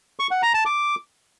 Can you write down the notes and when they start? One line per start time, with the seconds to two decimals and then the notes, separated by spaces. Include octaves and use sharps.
0.19 C#6
0.31 F#5
0.42 A#5
0.54 A5
0.66 D6